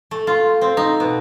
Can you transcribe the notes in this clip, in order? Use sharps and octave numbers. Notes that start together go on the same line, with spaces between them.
A3
F4
C4
D#4
B2